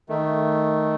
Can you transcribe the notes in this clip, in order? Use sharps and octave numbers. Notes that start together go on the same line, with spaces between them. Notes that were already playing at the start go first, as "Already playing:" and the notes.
D#3 A3